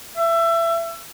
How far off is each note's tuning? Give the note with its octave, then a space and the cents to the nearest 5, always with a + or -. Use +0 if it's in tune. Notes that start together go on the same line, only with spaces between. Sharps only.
E5 +25